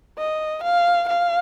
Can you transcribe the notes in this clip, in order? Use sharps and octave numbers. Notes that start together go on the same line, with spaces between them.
D#5
F5
F5